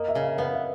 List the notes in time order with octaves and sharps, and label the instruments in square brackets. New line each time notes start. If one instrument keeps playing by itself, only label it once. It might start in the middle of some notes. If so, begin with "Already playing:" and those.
Already playing: [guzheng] A#3 [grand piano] D#5
[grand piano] E5
[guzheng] C#3
[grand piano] F5
[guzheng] B3 [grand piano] F5
[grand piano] E5